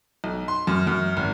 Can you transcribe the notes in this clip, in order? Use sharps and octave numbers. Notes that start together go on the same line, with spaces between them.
B1
C6
F#2
F#2
G#1